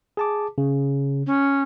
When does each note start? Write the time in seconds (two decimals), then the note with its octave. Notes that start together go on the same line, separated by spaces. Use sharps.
0.17 G#4 A5 D6
0.58 C#3
1.26 C#4